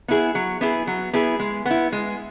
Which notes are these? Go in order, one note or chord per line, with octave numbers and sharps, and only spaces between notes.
B3 E4 G#4
F#3
B3 E4 G#4
F#3
B3 E4 G#4
G#3
B3 E4
G#3